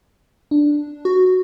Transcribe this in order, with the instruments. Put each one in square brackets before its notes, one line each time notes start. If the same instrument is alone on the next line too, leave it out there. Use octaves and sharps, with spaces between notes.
[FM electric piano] D4
[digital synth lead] F#4